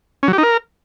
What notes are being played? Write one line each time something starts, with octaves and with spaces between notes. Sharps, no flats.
C#4
F#3
G4
D#4
A#4